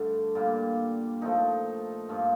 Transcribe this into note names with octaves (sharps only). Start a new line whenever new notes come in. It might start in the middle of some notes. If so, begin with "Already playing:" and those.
Already playing: G2 D3 A3 D4
A#2 G3 A#3
A#2 F3 A3 D#4
G2 F3 A#3